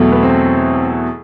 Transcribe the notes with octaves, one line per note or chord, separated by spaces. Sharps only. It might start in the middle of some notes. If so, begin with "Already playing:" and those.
Already playing: E2 B2 F#3 A3
B3
C4